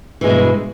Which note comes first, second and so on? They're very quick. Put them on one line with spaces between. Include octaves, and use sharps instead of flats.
E3 G#3 B2 G2